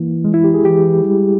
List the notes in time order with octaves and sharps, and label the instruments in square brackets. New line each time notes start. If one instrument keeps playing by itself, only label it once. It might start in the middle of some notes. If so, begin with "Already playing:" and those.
Already playing: [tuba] E3 [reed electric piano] A#3
[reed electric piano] G#3
E4
G4
G#4
[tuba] E3 [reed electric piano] G4
[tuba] G3